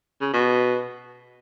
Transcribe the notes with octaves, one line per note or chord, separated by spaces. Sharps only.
C#3
B2